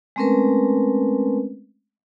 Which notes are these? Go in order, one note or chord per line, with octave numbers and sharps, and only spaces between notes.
G#3 A3 C4 C#4 A#4 B4